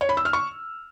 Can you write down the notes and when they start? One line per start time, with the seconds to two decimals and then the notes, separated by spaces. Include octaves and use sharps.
0.01 C#5
0.09 B5
0.17 E6
0.25 F6
0.33 C#6